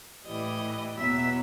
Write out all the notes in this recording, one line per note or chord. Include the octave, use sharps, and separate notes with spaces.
A2 E3 G3 D#5
E2 B2 F#3 E5